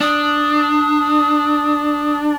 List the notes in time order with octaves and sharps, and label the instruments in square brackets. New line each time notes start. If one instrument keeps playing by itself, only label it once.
[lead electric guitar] D4 [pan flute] D#6